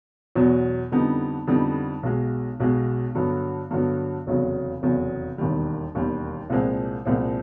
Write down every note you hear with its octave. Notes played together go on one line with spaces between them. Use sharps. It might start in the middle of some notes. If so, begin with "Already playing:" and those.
E2 B2 F#3
F2 D3 G3 B3 D#4
F2 D3 G3 B3 D#4
B1 B2 G#3
B1 B2 G#3
G2 D3 F#3 B3
G2 D3 F#3 B3
F1 E2 C#3 F#3
F1 E2 C#3 F#3
E1 D#2 D#3 G3
E1 D#2 D#3 G3
C2 A#2 F3 G#3 C4
C2 A#2 F3 G#3 C4